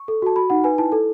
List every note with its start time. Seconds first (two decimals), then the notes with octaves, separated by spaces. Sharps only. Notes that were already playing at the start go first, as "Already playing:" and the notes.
Already playing: C#6
0.08 A4
0.22 F#4 A5
0.36 F#4 B5
0.50 D#4 F#5
0.64 B4 G#5
0.78 E4 A5
0.92 A4